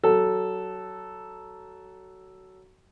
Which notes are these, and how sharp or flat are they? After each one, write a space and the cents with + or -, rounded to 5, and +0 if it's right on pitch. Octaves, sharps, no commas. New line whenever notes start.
F#3 +20 A4 +0